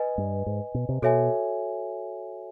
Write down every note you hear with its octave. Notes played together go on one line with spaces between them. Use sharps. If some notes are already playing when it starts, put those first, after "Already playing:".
Already playing: B4 D#5 G#5
G2
G#2
B2
C3
B2 F#4 A4 C#5 E5 G#5